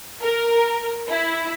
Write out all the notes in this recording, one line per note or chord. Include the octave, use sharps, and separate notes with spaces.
A#4
E4